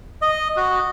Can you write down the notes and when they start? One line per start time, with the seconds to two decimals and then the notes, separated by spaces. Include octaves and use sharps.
0.22 D#5
0.56 F#4